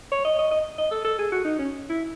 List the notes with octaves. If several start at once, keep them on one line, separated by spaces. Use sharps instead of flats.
C#5
D#5
D#5
D#5
D#5
A4
A4
G#4
F#4
D#4
C#4
E4